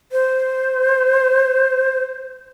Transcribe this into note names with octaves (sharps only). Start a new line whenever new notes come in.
C5